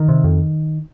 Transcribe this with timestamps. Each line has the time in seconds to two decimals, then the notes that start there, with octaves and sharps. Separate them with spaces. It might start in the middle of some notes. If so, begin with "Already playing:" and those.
Already playing: D#3
0.09 C3
0.24 F2